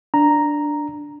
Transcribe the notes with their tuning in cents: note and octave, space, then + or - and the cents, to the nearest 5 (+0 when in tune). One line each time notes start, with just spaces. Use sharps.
D4 +0 A#5 +0